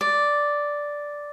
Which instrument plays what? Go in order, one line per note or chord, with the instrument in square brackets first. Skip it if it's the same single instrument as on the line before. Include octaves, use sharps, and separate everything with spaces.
[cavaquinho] D5